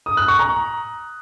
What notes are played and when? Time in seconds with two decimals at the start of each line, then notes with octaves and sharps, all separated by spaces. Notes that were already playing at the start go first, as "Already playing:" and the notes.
0.06 D#6
0.17 F#6
0.28 C#6
0.39 A#5